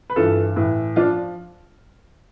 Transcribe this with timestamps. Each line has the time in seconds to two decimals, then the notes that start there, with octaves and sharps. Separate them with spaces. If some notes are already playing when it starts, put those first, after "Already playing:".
0.10 B4
0.16 G2 E3 F4 A4
0.56 A2 E3
0.96 F3 D4 F4